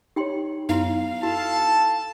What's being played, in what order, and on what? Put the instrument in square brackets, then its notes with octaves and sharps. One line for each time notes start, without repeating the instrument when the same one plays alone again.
[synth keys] D#4 C#5 [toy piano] G4 G5 C6
[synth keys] F#2 B3 [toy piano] D#4 E4 C6 [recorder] F5
[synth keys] E4 [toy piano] F#4 [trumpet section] A4 A5